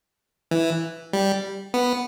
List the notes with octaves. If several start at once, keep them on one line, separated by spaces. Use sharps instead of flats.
E3
G3
B3